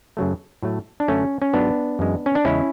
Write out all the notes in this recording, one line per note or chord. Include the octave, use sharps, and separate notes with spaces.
F#2 C#3 F#3 A3
A2 F#3 A3
D4
F#2 D3 A3 C#4
C#4
G#2 F#3 A3 B3 D4
F#2 E3 G#3
C#4
D4
E2 C#3 G#3 C#4 E4